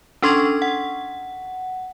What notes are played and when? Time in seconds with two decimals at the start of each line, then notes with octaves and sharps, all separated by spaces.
0.22 C#4 D4 A4 C6 C#6 G#6
0.62 F#5